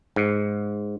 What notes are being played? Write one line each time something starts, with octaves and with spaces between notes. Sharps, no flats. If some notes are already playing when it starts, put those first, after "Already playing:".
G#2